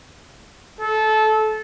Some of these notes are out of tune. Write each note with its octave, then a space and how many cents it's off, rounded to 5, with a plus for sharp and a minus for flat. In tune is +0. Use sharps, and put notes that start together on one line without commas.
A4 -20